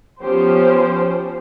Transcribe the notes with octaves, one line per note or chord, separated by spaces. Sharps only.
F3 B3 C#4 G4 C5